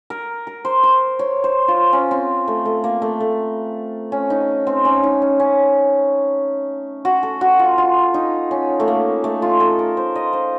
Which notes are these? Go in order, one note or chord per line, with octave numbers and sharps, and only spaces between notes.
A#4
A#4
C5
C5
C#5
C5
F4
C#4
C4
A3
A3
A#3
A3
A3
C#4
D#4
C4
C#4
D#4
C#4
C#4
F#4
A4
F#4
F4
F4
D#4
C#4
A3
A#3
A3
F4
A4
A#4
C5
D#5
C5